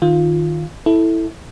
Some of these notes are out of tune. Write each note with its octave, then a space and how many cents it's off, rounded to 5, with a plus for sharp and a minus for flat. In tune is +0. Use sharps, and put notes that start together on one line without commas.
D#3 +0 F4 +0
E4 -10 A4 +0